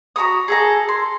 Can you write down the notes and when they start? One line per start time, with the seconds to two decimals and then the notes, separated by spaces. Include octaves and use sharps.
0.16 F#4 A#5 B5 D#6
0.48 G#4 A4 A#5
0.89 C6